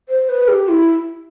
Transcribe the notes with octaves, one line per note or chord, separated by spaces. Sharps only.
C5
B4
G4
E4